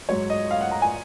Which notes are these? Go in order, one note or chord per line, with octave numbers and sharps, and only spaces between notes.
G#2 F#3 C#5
D#5
F5
F#5
A#5
G#5